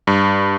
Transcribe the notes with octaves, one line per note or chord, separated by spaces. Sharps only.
G2